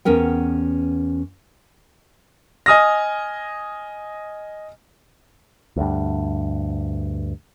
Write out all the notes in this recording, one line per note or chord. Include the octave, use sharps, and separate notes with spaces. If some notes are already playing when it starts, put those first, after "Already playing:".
E2 B3 C#4 A#4 G5
D#5 G#5 D#6 F6 A#6
D2 G2